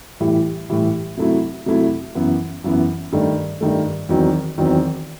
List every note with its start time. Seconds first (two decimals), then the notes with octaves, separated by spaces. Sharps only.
0.20 A2 E3 G3
0.70 A2 E3 G3
1.17 C3 F#3 A3 E4
1.66 C3 F#3 A3 E4
2.15 F#2 E3 B3
2.64 F#2 E3 B3
3.12 G2 D#3 A3
3.61 G2 D#3 A3
4.09 E2 D#3 F#3 C4
4.58 E2 D#3 F#3 C4